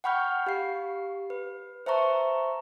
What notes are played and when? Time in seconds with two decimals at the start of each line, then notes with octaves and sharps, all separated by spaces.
0.04 F#5 G5 B5 C#6 F6 G6
0.46 G4 F5 C7
1.30 B4
1.86 C5 E5 A5 A#5 C#6